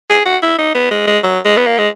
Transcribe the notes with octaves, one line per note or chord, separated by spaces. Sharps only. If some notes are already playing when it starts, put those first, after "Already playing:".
G#4
F#4
E4
D#4
B3
G#3
G#3
F#3
G#3
B3
A#3
G#3